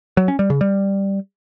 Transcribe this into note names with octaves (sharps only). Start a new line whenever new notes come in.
F#3
C#4
G3
C#3
G3